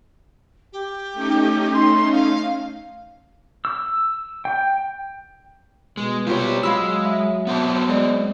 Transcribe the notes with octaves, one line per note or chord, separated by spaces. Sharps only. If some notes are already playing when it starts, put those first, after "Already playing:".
G4
A3 C#4 D#4
C6
F5
E6
G5
B2 G#3
G3 C4 F4 G4 C#5
F#3 G#3 F5 B5 E6
E5
B3 C4 A5
G#3 D5